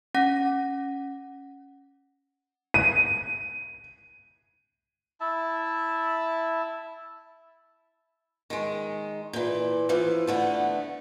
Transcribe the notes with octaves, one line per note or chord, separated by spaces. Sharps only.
C#4 F#5 A#6
D#7
E4 E5 A5
D#3 G#3
A#2 E3
E3 F3
D3 A3 B3